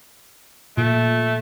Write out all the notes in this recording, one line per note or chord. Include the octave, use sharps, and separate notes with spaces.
A#2 A3